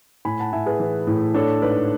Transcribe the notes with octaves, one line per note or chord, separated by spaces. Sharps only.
A2 G#5 B5
F#5 A5
A2 E5 G#5
G#4 B4
E3
A2
D4 A4 C#5
G#2 B4 D5